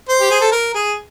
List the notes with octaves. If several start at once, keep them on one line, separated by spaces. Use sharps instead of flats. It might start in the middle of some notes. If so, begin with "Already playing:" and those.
C5
G4
G#4
A4
A#4
G#4